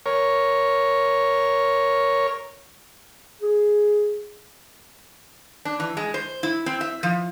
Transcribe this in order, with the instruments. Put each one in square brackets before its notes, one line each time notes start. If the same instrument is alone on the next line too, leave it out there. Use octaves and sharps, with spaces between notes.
[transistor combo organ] A#4 C#5
[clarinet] G#4
[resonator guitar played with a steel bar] D4
E3
G#3
C5
E4
C4
E5
F3